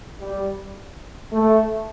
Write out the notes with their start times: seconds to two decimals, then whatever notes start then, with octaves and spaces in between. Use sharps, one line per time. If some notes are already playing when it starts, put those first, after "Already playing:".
0.21 G3
1.32 A3